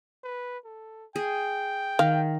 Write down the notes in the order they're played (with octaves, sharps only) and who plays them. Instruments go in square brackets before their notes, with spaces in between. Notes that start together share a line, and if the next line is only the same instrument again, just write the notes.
[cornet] B4
A4
[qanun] G#4 [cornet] G5
[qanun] D#3 [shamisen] F5